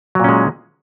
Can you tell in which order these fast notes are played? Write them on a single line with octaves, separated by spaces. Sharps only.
F#3 A#2 C#4 G#3